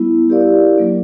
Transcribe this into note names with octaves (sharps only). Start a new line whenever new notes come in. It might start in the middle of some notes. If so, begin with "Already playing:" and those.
Already playing: G3 B3 E4
E4 G4 A#4 D5 F5
F#3 A#3 D4